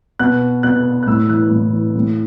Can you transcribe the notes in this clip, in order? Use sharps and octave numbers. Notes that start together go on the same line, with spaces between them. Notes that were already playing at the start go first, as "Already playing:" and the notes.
B2 F#6
B2 F#6
F#6
A2 E6
E3 F#6
A2
E3
A2